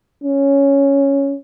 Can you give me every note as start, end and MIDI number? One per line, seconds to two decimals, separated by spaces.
0.24 1.38 61